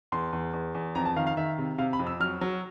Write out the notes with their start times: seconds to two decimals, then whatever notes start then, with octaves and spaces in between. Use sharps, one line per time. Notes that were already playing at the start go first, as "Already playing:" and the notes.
0.12 E2 C6
0.33 E2
0.53 E2
0.75 E2
0.95 F2 A#5
1.05 A5
1.16 D#3 F5
1.27 F5
1.37 D#3 E5
1.58 C3
1.78 C3 F5
1.93 B5
1.99 F2
2.07 E6
2.20 F#3 F6
2.41 F#3